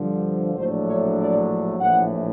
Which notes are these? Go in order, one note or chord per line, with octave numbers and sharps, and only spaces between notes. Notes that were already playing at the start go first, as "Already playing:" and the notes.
Already playing: G2 D3 F3
A#1 A2 F#3 A3 D4 C5
C#5
D5
A#1 A2 E3 F#5